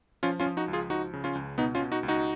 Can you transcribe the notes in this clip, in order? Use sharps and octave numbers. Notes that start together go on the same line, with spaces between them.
F3 C#4 F4
C#4 F4
F3
D#4 F#4
C#2
F4 G#4
F3 D#4 F#4
C#3
C#4 F4
C#2
B2 B3 D#4
C#4 F4
B2
D#4 F#4
C#2
D#4 F#4